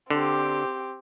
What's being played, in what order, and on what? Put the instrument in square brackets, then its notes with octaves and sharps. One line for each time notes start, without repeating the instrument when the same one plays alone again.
[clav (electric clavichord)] D3 [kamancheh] C4 G4